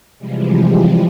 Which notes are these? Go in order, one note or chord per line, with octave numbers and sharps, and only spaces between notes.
C3 E3 F3 G3 G#3